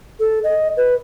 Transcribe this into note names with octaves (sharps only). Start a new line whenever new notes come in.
A4
D#5
B4